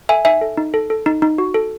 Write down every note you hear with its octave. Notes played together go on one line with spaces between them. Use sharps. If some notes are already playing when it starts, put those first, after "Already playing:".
A4 E5 G#5
D#4 E5 G#5
A4
D#4
A4
A4
D#4
D#4
F#4
A4